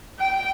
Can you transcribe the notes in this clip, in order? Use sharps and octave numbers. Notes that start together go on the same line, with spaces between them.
G5